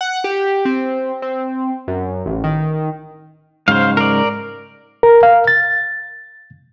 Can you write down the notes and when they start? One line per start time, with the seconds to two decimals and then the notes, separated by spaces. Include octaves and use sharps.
0.01 F#5
0.24 G4
0.65 C4
1.22 C4
1.88 F#2
2.26 A1
2.44 D#3
3.68 G#2 C#3 F#3 C5 F5
3.97 A#4 D5
5.03 A#4
5.23 F5
5.48 A6